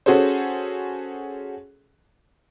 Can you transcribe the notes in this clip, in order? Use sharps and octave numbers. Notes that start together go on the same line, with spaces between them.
C#4 F#4 G#4 A4 C5